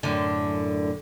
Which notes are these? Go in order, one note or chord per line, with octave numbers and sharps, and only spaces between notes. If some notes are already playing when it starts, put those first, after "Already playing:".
F#2 A2 D3